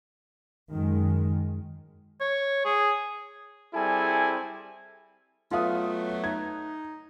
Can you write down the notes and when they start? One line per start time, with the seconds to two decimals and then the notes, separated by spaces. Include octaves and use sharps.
0.71 F#2 D#3 G#3
2.21 C#5
2.65 G#4
3.74 G3 C4 E4 G#4 A4 G#5
5.51 F#3 A3 B3 F4 F5 D#6
6.24 D#4 G#6